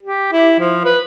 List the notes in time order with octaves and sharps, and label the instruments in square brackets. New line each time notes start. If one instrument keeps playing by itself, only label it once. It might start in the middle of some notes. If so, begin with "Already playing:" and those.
[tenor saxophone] G4
E4
F3
B4